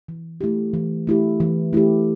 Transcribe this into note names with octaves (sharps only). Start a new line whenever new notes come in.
E3
A3 E4 G4
E3
A3 E4 G4
E3
A3 E4 G4